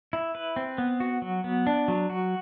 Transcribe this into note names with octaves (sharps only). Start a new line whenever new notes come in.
E4
B4
C4
B3
F#4
F#3
B3
D4
F#3
F#4